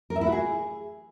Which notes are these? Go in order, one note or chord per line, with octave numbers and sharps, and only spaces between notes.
A#4
E5
E4
F#4
G#4